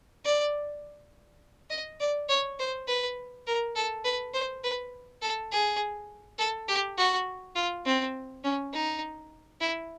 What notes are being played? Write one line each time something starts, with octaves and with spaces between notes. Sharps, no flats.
D5
D#5
D5
C#5
C5
B4
A#4
A4
B4
C5
B4
A4
G#4
A4
G4
F#4
F4
C4
C#4
D#4
E4